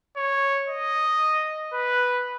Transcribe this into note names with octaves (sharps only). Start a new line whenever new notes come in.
C#5
D#5
B4